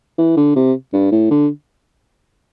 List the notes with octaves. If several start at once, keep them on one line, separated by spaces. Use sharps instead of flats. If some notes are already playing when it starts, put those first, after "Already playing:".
E3
D3
C3
G2
A2
D3